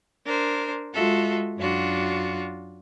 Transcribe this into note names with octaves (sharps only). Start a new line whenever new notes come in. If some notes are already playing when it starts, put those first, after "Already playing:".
D4 A#4 C5
G#3 F4 F#4 A4 E5
F#2 D4 F4 F#4